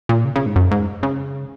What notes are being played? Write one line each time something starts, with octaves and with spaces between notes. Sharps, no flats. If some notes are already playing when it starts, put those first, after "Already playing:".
A#2
C#3
C#3
G#2
F#2
G#2
C#3